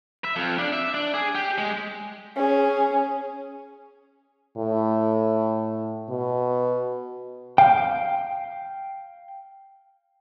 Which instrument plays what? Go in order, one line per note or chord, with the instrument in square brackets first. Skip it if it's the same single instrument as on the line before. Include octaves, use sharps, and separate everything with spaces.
[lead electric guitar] E5
F2
D4
E5
D4
G#4
G4
G#3
[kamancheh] C#4 G#4
[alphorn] A2
B2
[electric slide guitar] F5 G5